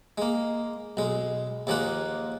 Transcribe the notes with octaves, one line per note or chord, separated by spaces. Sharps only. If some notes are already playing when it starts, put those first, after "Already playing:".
G#3 A#3
B1 G#3
D#2 F3 G#3 A#3 F#5